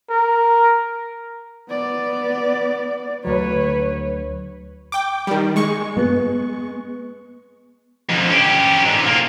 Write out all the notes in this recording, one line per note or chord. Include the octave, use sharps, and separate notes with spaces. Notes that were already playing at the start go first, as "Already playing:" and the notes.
A#4
B3 D5
D2 F#3 B4 C#5
G5 D6
D#3 G3
G#3 C#6
B3
F2 D3
C#4 G4
G#2 D3
A#3 F4